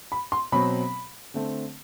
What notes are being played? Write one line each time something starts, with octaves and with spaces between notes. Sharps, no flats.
B5
C6
B2 F#3 C4 B5
D3 A3 C4